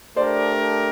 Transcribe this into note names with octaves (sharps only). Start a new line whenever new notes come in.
A3 D4 G4 A#4 C5 D5